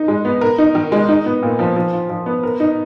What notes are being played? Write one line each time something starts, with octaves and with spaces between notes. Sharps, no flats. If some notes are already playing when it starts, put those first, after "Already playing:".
Already playing: D#4
G#3
B3
A#4
D#4
D#3
G#3
D#4
B3
A#2
F3
F3
F4
F3
B3
A#4
D#4